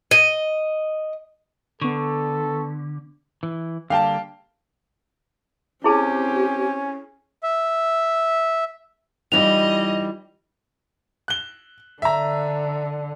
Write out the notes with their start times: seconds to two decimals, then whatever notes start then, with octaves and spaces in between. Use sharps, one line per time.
0.11 D#5
1.81 D3 B3 A4 C#6
3.43 E3
3.90 D3 G3 A#3 F5 G5 A5
5.84 C4 C#4 E4 G4 G#4 A5
7.43 E5
9.32 E3 G3 D#4 F4 D#5 F7
11.28 F#6 G7
12.02 D3 E5 A#5